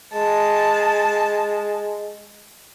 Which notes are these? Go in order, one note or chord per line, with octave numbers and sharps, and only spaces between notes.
G#3 A5